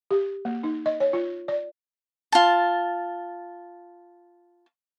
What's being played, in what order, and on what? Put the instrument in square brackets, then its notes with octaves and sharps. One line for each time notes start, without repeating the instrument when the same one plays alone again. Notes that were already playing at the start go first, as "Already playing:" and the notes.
[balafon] G4
A#3
D#4
D#5
C#5
F4
D5
[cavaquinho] F4 A5